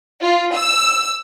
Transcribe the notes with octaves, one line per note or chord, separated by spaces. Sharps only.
F4
E6